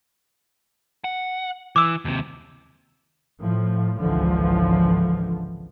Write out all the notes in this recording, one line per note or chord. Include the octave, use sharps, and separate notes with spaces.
F#5
E3 D6 E6
D#2 C3
A2 F3
G#1 C#2 D3 E3 F3